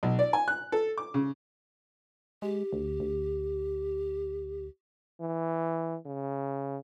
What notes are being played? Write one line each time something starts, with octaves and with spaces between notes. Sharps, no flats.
B1
D5
G#5
F#6
A4
D6
C#3
G#3 G4
D2
D2
E3
C#3